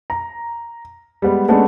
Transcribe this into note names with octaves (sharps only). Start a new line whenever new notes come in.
A#5
G3 G#3 B3
G#3 A3 B3 C#4 D4